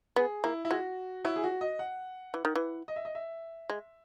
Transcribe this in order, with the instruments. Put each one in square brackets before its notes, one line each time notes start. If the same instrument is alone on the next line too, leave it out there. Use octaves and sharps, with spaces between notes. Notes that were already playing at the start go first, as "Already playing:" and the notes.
[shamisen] B3 [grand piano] G#4
[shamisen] A#3 [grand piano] E4
[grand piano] E4
[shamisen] G#3 [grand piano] F#4
[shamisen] F#3 [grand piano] E4
[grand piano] G#4
F#4
D#5
F#5
[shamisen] E3
D#3
E3
[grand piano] D#5
E5
D#5
E5
[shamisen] G#3